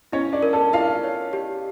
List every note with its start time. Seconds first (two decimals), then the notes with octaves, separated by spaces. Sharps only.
0.12 C#4 E4 C#5
0.33 D4 D5
0.43 A#4
0.53 A4 A5
0.73 E4 F4 F5
1.03 C#5
1.33 G4